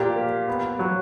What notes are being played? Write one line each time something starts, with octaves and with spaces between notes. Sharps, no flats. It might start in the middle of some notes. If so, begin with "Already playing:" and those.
Already playing: A#2 G4
A#3
B3
F#3